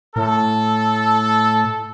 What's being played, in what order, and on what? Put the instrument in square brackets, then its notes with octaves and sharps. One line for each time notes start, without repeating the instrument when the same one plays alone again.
[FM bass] A2 [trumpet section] A4